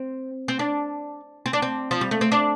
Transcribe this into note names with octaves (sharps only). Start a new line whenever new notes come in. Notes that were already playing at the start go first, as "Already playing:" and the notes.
Already playing: C4
C4
D4
C4
D4
C4
F3
G3
A3
C4
D4